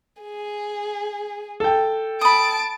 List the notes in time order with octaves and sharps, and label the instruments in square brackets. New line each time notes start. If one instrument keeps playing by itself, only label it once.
[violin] G#4
[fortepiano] A4 G5
[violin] A5 D7 [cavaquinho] B5 D#6